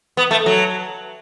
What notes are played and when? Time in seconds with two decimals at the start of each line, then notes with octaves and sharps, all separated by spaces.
0.17 B3
0.31 A3
0.46 F#3